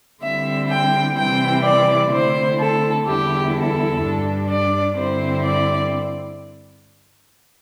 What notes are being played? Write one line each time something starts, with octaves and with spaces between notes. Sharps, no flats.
D3 G3 C4 E4 E5
G5
C3 E3 G3 C4 E4 G5
D5
D3 A3 C4 E4 C5
A4
E2 D3 G3 E4 G4
A4
G2 G3 D4
D5
G2 D3 C4 E4 C5
D5